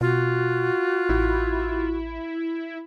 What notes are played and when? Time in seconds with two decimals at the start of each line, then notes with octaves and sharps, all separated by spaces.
0.01 B2 F4 F#4
1.09 A1 E4